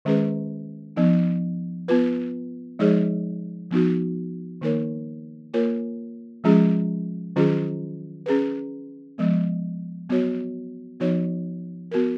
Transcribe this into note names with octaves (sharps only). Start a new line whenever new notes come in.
D#3 G#3 C#4 G#4 B4
F3 B3 D#4
B3 F4 B4
F3 G#3 D#4 G#4 C#5
F3 B3 D#4 F#4
D#3 A#3 D#4 A#4 C#5
A#3 F4 A#4 C#5
F3 G#3 C#4 F4 G#4
D#3 F#3 C#4 F4 G#4
C#4 G#4 B4
F3 G#3 B3
F#3 B3 F#4 C#5
F3 B3 D#4 F#4 C#5
B3 F#4 A#4